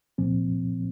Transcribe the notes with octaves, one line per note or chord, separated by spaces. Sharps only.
C2 A#2 F3 C4